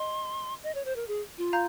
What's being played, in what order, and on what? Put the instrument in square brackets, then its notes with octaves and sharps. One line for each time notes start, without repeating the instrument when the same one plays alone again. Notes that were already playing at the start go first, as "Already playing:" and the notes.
Already playing: [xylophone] D#5 [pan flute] C6
[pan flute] D#5
C#5
C5
A#4
G#4
F4
[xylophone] F5 A#5 G6